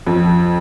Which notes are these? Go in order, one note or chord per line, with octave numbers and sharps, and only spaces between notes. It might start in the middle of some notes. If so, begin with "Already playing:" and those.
F2